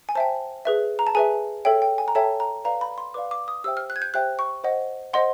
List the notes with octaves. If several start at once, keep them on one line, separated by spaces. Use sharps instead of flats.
G#5
C5 E5 G5 A5
G#4 B4 E5
A#5
A5
G#4 B4 E5 G#5
A4 C#5 E5 G5
G5
G#5
A#5
A4 C#5 E5 G5 A5
A#5
B4 D5 F5 A#5
B5
C6
B4 D5 F5 D6
D6
D#6
G4 C5 E5 G5 E6
F6
F#6
G#6
G6
G4 C5 E5 G5 F#6
C#6
C5 D#5 F#5
C5 D#5 F#5 C6